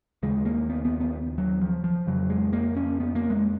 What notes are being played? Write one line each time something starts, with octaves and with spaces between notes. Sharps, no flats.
D#2 C#3 G#3
A#3
B3
B3
B3
F#3
F3
F3
F2 C#3 F#3
G#3
A#3
C#4
B3
A#3
G#3